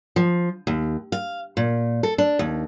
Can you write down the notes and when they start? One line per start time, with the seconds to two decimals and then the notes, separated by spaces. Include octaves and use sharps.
0.16 F3
0.67 D#2
1.12 F5
1.57 A#2
2.03 A4
2.18 D4
2.39 D#2